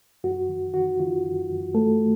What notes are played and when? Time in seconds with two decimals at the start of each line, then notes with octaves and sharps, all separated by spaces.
0.24 F#2 F#4
0.49 D#3
0.74 D#3 F#4
1.00 D#3 F4
1.24 F#2
1.49 F#2
1.74 A3 A4
2.00 A3